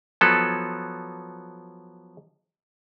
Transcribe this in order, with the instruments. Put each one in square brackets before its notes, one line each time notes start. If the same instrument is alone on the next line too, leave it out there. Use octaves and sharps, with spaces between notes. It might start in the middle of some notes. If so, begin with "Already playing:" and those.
[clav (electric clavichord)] F3 F#3 B3 A4